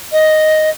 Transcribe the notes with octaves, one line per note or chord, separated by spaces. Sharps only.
D#5